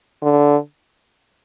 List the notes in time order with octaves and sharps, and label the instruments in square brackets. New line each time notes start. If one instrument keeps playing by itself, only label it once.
[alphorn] D3